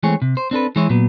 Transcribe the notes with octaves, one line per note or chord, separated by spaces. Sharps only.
E3 G#3 A3 C4 G#4 C#5
C3
C5
C4 D4 A4 B4
E3 G#3 E4 C#5
A#2 F#3 B3